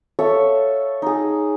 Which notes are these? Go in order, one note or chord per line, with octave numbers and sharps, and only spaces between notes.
A4 C#5 E5 F5
D#4 G#4